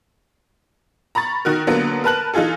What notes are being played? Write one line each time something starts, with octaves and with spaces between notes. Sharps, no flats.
A#5 B5 C#6 A6
D#3 F#4 A#4
D3 F#3 A#3 B3
A#4 B4 A5 F#6 F#7
E3 D#4 F4 G#4 A4